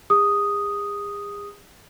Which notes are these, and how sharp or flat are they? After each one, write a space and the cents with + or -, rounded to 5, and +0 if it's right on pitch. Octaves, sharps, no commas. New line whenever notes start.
G#4 -40 D#6 +0